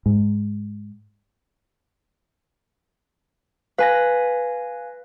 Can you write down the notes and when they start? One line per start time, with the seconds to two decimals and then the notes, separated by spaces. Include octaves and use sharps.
0.06 G#2
3.78 B4 F5 G#5 A#6